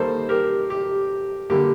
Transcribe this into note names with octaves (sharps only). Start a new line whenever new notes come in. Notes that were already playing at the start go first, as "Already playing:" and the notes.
Already playing: D#3 G3 A#3 A4 C5
G4 A#4
G4
D3 G3 A#3 G4